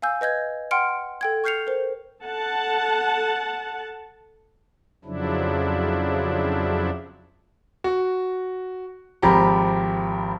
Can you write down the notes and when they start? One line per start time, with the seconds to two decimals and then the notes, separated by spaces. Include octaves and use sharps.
0.02 F5 G#5 E6 G6
0.21 B4 D#5 G6 G#6
0.71 F#5 G5 C6 F6 C#7 D7
1.21 A4 G5 G#6
1.44 C#6 F6 G6 C7 C#7 F7
1.67 A#4 C5
2.22 A4 F#5 A5
5.05 F2 C#3 F3 F#3 D4 E4
7.84 F#4
9.22 G#1 F3 G4 A#5 B5